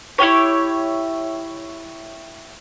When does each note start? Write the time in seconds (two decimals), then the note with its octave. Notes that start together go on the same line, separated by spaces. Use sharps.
0.18 E4 F4 G4 C#5